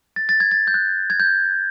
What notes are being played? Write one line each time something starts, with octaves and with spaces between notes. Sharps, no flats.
A6
A6
G#6
A6
G6
F#6
G#6
G6